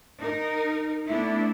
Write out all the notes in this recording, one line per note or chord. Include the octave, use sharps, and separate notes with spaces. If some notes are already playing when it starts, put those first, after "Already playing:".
D#4 A#4
A3 B3 D4 E4